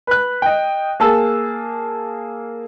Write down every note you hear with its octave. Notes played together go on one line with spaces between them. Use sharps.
B4 F#6
D#5 G5
A#3 G#4 A5 E6